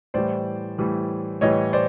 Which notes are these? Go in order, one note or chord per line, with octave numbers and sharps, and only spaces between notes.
A2 E3 G3 C5 D5
A2 E3 G3
A2 E3 G3 C#5 D#5
C5 D5